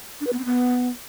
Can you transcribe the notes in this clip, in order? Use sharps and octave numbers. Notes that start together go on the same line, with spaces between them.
D4
B4
B3
C4
B3